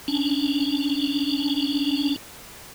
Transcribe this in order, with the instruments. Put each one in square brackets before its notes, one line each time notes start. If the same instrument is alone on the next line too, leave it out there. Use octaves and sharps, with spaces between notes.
[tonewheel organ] C#4 D4